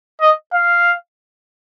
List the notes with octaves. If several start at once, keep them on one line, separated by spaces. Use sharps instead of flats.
D#5
F5